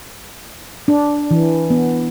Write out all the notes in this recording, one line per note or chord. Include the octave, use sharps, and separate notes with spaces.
D4
E3
B3